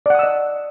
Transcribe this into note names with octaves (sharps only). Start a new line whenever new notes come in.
D5 D#5 F#5 D#6 E6